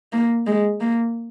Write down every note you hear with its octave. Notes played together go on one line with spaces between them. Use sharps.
A#3
G#3
A#3